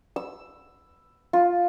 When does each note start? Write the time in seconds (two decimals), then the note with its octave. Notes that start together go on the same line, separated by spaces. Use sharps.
0.16 E6
1.33 F4